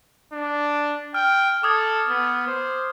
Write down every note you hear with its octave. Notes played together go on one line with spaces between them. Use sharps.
D4
G5 F6
A4 D6 D#6 G#6
B3
C5